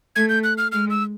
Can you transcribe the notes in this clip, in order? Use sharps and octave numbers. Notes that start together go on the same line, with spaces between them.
A3 G#6
G6
F#6
F6
G#3 F6
E6